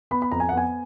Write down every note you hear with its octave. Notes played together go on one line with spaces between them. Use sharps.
B3 B5
B5
F2 A#5
G#5
F#5
B3 G#5